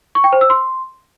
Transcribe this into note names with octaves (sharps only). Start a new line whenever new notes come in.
C#6
G5
C5
E6
C6